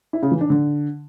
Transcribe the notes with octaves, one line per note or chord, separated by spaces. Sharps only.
E4
C#3
E3
D4
D3